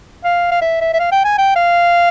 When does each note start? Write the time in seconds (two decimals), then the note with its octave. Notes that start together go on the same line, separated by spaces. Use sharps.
0.24 F5
0.51 F5
0.61 E5
0.81 E5
0.93 E5
0.99 F5
1.11 G5
1.25 G#5
1.38 G5
1.56 F5